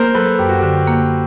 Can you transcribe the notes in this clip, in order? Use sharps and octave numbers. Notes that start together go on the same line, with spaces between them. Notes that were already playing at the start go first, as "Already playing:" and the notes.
Already playing: A#3 A#4 C5
F#3 A4 B4
F#2 G4
F#4
D3 G4
A#3